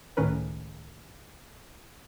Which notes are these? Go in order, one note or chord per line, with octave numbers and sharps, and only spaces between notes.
C#2 A2 D#3 C#4 A#4 B4